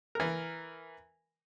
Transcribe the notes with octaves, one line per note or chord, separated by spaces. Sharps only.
E3 A#4